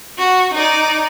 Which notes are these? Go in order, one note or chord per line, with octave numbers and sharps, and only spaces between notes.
F#4
D#4 D5